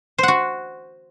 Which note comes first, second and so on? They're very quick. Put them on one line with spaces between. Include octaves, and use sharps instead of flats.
C5 F#5 F#4